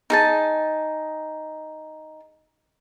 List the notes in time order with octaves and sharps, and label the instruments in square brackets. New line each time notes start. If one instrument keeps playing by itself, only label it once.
[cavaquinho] D#4 G#4 A5